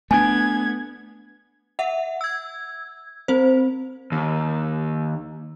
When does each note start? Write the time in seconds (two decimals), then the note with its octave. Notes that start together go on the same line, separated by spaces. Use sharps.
0.11 A3 B3 D4 G#5 G#6
1.79 E5 F#5
2.21 E6 G#6
3.28 C4 C5
4.12 D#2